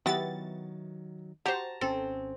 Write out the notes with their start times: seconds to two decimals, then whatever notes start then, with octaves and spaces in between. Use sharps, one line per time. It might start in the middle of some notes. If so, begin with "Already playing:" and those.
0.06 D#3 F#3 B3 E4 F#4 G4 A6
1.46 F#4 G4 C5 A5 A#5
1.81 G#1 C4 C#4 A4